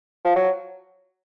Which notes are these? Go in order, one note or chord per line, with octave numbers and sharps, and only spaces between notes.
F3
F#3